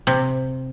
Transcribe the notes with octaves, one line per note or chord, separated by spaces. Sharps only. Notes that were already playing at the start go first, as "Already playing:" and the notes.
C3